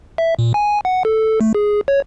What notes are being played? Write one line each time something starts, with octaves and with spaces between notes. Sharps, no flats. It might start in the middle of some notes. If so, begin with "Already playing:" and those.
E5
A#2
G#5
F#5
A4
A3
G#4
C#5